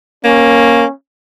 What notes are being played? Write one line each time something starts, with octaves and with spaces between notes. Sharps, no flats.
A#3 C#4